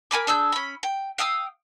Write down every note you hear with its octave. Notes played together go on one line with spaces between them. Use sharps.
A#4 G#5 B5 D6
D4 G#4 E6 G6
C#4 B5
G5
F5 G5 D#6 E6